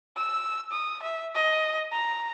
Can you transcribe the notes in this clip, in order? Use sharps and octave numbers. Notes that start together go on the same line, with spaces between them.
E6
D#6
E5
D#5
A#5